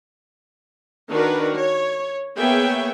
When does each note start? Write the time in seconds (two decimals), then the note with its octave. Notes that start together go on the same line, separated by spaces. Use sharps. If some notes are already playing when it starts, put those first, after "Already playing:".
1.10 D#3 D4 F#4 A#4 B4
1.56 C#5
2.37 A#3 B3 G#4 C#5 E5 G5